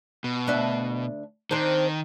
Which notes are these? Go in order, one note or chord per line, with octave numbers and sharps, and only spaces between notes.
B2
D2 D4 E5
D#3 C4 D4 C5